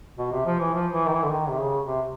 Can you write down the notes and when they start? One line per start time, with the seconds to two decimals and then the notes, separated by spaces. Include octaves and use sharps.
0.18 B2
0.32 C3
0.46 F3
0.60 E3
0.74 F3
0.93 E3
1.06 D#3
1.12 E3
1.23 D3
1.30 D#3
1.49 C3
1.58 C#3
1.86 C3